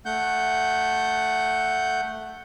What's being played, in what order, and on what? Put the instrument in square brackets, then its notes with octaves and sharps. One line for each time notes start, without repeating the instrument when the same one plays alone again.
[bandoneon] A3 F#5 G6